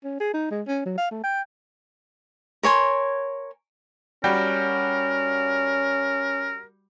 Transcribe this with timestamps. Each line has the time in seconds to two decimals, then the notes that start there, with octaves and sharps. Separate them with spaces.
0.04 C#4
0.20 G#4
0.34 D#4
0.51 G#3
0.67 C#4
0.86 F#3
0.98 F5
1.11 A3
1.24 G5
2.63 A#4 C#5 G#5 C6
4.24 G3 C#4 F#4 A#4 G5